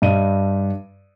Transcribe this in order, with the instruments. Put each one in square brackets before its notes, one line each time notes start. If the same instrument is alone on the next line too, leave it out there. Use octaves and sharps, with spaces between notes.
[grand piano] G2 D#5 D#7